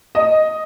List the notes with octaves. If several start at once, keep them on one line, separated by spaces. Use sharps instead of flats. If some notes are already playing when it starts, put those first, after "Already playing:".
D#5